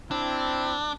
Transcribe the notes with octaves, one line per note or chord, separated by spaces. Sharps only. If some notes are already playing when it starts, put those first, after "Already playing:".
C4 D4 E4